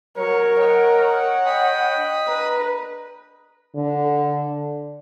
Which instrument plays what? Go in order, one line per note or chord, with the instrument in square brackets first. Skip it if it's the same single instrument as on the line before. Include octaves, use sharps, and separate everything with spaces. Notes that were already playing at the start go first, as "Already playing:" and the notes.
[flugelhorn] F#3 [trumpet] A#4 [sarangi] C#5
[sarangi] C#5 [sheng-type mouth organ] D#5 G5 [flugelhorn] F#5
[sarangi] C#5
[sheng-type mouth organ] D#5 B5 D#6 [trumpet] G5
[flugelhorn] D4
[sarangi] B4 [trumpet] A#5
[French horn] D3